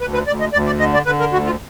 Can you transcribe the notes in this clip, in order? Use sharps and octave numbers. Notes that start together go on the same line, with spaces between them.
D2 B4
B4
D2 D5
D#5
D2 D5
D5
D3 D#5
D5
D3 B4
A#4
D2 F#4
F4